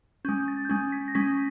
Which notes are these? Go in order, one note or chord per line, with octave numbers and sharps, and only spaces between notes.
G#3 C#4 G6
A6
G6
G#3 C#4 G#6
B6
A#6
G#3 C#4 B6